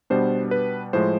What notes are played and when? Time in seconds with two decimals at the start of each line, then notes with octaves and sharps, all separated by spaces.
0.10 B2 G3 B3 D4 C5
0.51 B4
0.93 A2 F3 G#3 C5